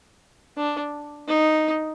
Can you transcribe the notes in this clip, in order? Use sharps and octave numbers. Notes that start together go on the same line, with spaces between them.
D4
D#4